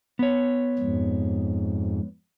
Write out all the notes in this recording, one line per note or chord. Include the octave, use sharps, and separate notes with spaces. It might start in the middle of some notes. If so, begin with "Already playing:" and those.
B3 C#5
F2 G#2